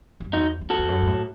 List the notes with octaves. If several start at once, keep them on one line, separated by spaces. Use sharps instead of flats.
F#2
E2 D#4 F#4
E2
F#4 A4
E2
F#2
G#2
A2